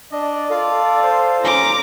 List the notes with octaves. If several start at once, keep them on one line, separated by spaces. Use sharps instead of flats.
D4 D5 D#5
F4 A4 F5
C5
C#4 A#5 D6